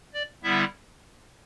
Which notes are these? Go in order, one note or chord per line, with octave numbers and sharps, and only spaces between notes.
D5
D3 G3 B3 E4 E5